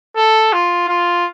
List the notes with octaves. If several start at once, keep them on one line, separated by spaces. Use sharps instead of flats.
A4
F4
F4